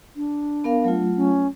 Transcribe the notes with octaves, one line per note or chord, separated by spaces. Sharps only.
D4
B3 A#4 F5
F#3 A3 F4
C#4